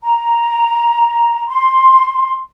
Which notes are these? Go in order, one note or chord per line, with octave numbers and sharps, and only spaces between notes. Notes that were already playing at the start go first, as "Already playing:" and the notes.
A#5
C6